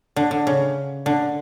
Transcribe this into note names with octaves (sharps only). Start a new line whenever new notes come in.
D3
D3
C#3
D3